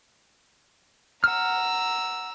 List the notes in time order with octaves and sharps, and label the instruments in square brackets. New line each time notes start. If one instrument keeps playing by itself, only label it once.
[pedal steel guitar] F#5 F6 [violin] A#5 E6